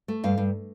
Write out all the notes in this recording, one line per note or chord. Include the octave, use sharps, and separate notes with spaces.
A3
G2 F5
G2